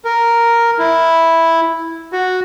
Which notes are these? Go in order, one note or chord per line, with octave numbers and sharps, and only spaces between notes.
A#4
E4
F#4